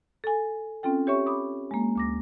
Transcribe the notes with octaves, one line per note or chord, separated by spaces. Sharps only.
A4 G#5
C4 C#4 F4 A4 G5
G4 C#5 E5 C#6
B5 D6 D#6
G#3 A#3
D2 D6 A#6